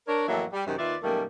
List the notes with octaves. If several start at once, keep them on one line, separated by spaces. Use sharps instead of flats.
D4 A#4 C#5
F2 A2 E3 F#3 A#3 E5
G3
F#2 C3 D#3
D#2 D#3 F4 B4 D5 E5
F#2 B2 D#3 G3 A3 A#3